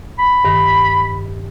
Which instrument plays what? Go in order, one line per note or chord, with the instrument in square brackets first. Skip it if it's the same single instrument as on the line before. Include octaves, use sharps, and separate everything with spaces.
[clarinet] B5
[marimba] G2 D#3